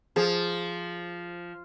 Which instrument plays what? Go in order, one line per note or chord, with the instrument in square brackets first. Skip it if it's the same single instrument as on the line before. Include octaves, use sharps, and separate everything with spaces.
[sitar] F3 [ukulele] G#4